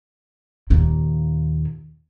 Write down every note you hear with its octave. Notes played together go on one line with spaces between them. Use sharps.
D#2 A#2